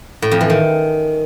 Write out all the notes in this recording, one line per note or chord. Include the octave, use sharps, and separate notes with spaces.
A2
F2
E3
D#3